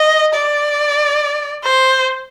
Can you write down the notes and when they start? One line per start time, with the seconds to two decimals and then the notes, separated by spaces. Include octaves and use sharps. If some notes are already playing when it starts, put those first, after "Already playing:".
Already playing: D#5
0.33 D5
1.63 C5